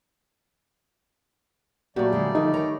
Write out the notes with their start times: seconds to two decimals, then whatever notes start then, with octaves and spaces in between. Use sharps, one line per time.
1.96 A#2 F#3 G3 A3 F#4 G4 D5
2.12 D3 G#3 G4
2.35 D3 D#3 F3 D#4 G#4
2.54 D#3 C#5 A#5